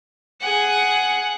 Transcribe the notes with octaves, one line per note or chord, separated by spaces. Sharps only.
G#4 F#5